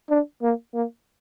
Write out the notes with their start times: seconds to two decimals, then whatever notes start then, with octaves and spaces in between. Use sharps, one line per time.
0.10 D4
0.42 A#3
0.74 A#3